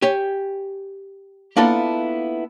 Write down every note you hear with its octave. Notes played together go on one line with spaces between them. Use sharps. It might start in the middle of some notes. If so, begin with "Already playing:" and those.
G4 C#5 G#5
A#3 B3 D4 E4 F4 A4